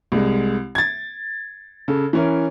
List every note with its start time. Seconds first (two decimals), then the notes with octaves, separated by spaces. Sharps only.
0.12 C2 G#3
0.75 G#6 A6
1.88 C#3 A4
2.13 E3 C#4 A#4